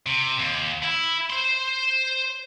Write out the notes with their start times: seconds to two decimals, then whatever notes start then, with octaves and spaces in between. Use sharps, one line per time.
0.06 C3
0.39 D#2
0.83 E4
1.30 C5 C6